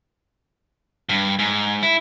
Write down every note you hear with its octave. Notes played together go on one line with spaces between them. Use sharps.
G2
G#2
E4